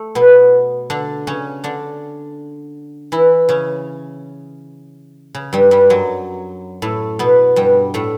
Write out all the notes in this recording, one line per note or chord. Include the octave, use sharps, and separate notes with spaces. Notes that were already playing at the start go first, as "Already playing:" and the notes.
Already playing: A3
B2 B3
D3 D4
C#3 C#4
D3 D4
E3 E4
C#3 C#4
C#3
G2 G3
G2 G3
F#2 F#3
A2 A3
B2 B3
G2 G3
A2 A3